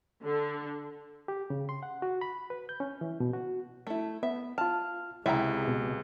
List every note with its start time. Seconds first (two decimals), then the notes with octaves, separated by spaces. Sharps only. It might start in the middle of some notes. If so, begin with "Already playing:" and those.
0.25 D3
1.28 G4
1.50 C#3
1.69 C6
1.83 F#5
2.02 F#4
2.21 B5
2.50 B4
2.69 G6
2.80 C#4
3.01 E3
3.20 B2
3.34 F#4
3.87 A3 E4
4.23 B3 E5
4.58 F4 A5 F6
5.26 C#2 C3 G#3 E4 E5 G5 A#5
5.68 B2